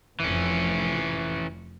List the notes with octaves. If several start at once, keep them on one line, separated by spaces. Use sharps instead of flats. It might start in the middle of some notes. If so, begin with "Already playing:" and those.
F1 E3 C#4